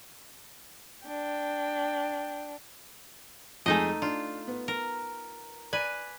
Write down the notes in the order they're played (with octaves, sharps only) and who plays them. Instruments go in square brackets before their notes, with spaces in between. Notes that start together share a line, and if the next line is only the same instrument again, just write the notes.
[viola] D4 [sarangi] G5
[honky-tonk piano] F2 G#3 G#5 [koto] A3 D#4 D#5
[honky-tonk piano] D4 [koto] F4
[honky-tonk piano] B3
[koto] A#4
[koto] B4 G#5 [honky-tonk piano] D5